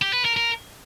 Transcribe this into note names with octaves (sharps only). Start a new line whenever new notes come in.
G4
B4
A#4
A#4